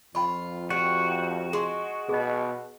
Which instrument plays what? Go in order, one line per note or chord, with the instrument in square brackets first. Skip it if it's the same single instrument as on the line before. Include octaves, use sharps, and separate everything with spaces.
[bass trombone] F2 [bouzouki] F4 [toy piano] G5 B5 C#6
[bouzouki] G3 [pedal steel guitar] F#4
[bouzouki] G#3 [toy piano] G#4 C6
[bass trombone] B2 [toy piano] G#4 D#5